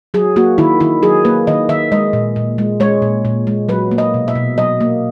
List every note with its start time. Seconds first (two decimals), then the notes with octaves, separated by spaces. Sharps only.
0.14 F#3 G#4
0.36 A#3 F#4
0.58 D#3 E4
0.80 D#3 E4
1.03 F#3 G#4
1.25 A#3 B4
1.47 D#3 D#5
1.69 D#3 E5
1.92 G#3 D#5
2.13 A#2
2.36 A#2
2.58 G#3
2.80 G#3 C#5
3.02 A#2
3.25 A#2
3.47 G#3
3.69 F#3 B4
3.91 A#3
3.98 D#5
4.14 B2
4.28 E5
4.35 B2
4.58 F#3 D#5
4.81 A#3